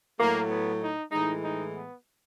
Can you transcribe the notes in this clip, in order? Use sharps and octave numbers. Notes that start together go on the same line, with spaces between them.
A2 F#3 A3 A#3
B3
D#4
A2 E3 G#3 D#4
D#4
B3